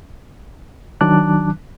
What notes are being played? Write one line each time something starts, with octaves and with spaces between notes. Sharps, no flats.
D#3 F#3 D4 A5 D6 F#6